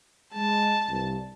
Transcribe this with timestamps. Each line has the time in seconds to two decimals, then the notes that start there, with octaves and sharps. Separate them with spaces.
0.34 G#3 A5
0.88 C2 G2